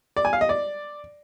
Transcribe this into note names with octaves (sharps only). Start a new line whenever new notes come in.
D5
G#5
F5
D#5
D5